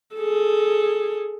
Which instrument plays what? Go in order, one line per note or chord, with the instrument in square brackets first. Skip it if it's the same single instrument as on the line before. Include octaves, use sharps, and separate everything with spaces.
[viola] G#4 A4